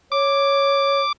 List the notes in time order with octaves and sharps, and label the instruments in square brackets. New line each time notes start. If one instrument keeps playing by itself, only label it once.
[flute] C#5 [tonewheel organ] D6